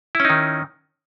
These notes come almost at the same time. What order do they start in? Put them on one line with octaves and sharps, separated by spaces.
E4 C#4 D#4 D#3